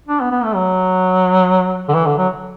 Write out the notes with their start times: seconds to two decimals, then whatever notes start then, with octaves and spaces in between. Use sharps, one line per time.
0.09 D4
0.21 B3
0.32 B3
0.44 A3
0.55 F#3
1.89 D3
1.94 E3
2.06 D3
2.18 F#3